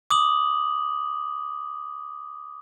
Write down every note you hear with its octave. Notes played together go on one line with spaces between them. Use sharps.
D6 D#6 F#7